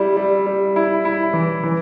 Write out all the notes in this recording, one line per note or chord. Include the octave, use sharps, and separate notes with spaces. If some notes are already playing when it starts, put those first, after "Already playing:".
Already playing: G3 E4
G3
G3
E4
E4
E3
E3